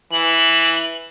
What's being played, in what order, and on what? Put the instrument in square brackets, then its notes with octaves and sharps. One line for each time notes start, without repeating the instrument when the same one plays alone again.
[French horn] E3 [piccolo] F#7